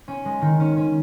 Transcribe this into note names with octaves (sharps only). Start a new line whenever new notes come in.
C#4
G#3
D#3
C#4
C#4